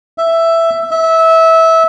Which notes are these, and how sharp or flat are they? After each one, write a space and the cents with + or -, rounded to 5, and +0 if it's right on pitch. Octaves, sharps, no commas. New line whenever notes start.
E5 +5
E5 -20